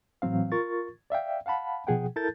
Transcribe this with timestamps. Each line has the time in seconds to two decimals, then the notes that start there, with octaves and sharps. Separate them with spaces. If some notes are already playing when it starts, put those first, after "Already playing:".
0.22 A2 E3 F#3 C4 F5
0.52 F4 A#4 C#6 A6
1.10 D5 E5 F5 G5
1.46 F5 F#5 A5 B5
1.87 B2 F3 G#4 F#5 G5
2.16 E4 A4 A#4 A5 G6 A6